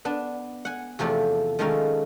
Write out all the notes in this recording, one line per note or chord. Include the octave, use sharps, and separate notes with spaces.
B3 D4 A5
F#5 G#5
E2 C3 F3 A3 D5
D#3 F3 G#3 A3 C#4 A#4